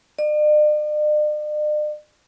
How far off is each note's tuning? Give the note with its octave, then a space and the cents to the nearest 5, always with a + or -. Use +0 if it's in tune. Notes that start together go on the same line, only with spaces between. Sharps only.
D5 +45